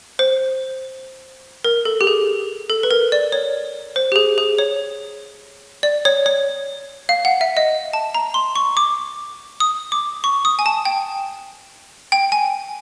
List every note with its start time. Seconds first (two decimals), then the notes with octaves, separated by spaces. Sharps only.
0.19 C5
1.64 A#4
1.85 A4
2.01 G4
2.07 G#4
2.70 A4
2.83 B4
2.91 A#4
3.12 D5
3.32 C#5
3.96 C5
4.12 G4
4.16 G#4
4.38 G#4
4.58 C#5
5.83 D5
6.05 C#5
6.26 C#5
7.09 F5
7.25 F#5
7.41 E5
7.57 D#5
7.93 A5
8.15 A#5
8.34 C6
8.56 C#6
8.77 D6
9.60 D#6
9.92 D6
10.24 C#6
10.45 D#6
10.59 G#5
10.66 A5
10.85 G5
12.12 G5
12.32 G#5